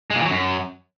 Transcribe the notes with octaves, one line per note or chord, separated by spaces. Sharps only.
G#3
A#2
E3
F#3
F#2